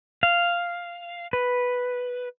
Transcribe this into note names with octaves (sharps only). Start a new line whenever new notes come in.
F5
B4